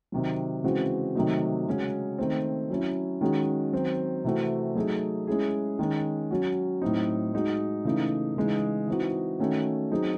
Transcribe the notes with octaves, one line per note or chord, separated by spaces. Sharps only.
C3 D#3 F#3
C#3 E3 G#3 C4 F#4
C3 D#3 F#3 A3 D#4
C#3 G#3 C#4 F#4
D#3 A3 C4
F#3 C#4 E4
D#3 G#3 C#4 F#4
D#3 F#3 C4
C3 E3 A3 C4 F#4
F#3 A3 D#4 G#4
G#3 C#4 E4 G#4
D#3 G#3 C#4
F#3 C#4 F#4
A2 F#3 C4 D#4
G#3 D#4 F#4
C#3 E3 A3 D#4
C#3 E3 G#3 D#4
E3 C4 D#4 F#4
D#3 A3 C#4 F#4
F#3 C4 D#4 G#4